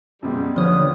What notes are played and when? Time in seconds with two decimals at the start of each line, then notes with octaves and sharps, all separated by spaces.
0.22 F#2 B2 G3 G#3
0.56 D#2 D3 F3 G3 B4 C#5 D#6 F6